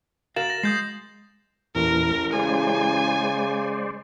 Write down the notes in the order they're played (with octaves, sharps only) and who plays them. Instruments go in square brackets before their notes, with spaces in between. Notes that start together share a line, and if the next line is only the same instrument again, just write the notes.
[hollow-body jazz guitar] F#4 A#4 F5 [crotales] A6 E7 F#7
[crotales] A#6
[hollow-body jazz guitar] G#3 [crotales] D#6 G6 C7
[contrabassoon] A1 [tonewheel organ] E2 A#2 E3 [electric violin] A#4
[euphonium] C#3 [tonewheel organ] G#3 C5 D5 [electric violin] G#5